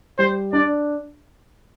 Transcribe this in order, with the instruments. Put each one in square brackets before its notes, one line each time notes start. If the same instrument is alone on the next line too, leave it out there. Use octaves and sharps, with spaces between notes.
[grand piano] G3 [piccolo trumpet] C5
[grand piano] D4 [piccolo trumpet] D5